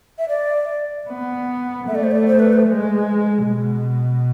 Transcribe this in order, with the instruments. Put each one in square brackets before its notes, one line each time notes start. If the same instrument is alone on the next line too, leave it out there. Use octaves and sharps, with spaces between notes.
[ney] E5
D5
[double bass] B3
[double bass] A3 [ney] E5
[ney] D5
C5
D5
C5
B4
C5
[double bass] G#3
B2